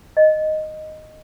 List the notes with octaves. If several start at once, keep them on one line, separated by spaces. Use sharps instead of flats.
D#5